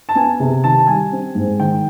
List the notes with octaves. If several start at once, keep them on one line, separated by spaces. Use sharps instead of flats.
A5
B3 G#5
C3
D#3 A5
G3 G#5
C4
G#2
D#3 G5